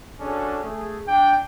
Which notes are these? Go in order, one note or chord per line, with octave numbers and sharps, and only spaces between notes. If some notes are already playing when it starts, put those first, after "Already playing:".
C#4 D4 F#4 G#4 A4
A3 G#4
D4 G5